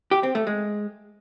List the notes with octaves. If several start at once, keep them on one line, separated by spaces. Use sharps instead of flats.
G4
C4
A3
G#3